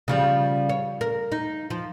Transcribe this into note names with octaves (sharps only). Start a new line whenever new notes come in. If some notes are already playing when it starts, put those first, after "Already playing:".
C#3 F3 G3
C#5
A#4
D#4
F3